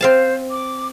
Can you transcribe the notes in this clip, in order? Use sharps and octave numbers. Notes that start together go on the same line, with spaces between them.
C4 C5 F5 A5
D6